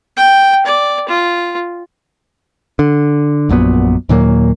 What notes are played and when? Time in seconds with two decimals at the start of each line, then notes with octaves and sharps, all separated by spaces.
0.17 G5
0.66 D5
1.09 F4
2.79 D3
3.49 A#1 F#2 A#2 B3
4.09 D#2 A#2 F#3 A#3